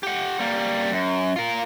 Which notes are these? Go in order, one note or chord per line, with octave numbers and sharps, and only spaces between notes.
G4 F#5
G3 A#3
F#2
F4 A#4